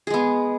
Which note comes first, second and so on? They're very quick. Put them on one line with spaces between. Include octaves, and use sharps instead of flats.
G#4 G#3 B3